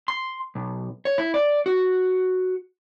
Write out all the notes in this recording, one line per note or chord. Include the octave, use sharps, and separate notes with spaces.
C6
B1
C#5
E4
D5
F#4